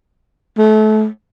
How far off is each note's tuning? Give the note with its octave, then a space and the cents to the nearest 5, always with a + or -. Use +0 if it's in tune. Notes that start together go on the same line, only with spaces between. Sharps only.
A3 -30